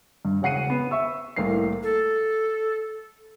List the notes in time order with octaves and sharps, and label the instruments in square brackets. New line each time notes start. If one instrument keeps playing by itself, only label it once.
[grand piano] G2
E1 C#3 F#5 C7 D#7
B3
E5 C#6 E6
C2 A2 A#3 F5 C7
[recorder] A4